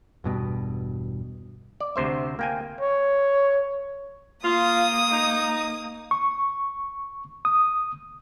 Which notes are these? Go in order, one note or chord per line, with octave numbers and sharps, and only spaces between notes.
E1 G2 B2
D5
D2 C3 C5 E5
A#3 G5 G#5
C#5
A#3 F4 D#6
D#4
C#6
D#6